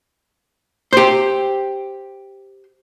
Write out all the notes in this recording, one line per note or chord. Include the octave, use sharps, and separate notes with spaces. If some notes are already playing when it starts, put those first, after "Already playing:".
G4 C5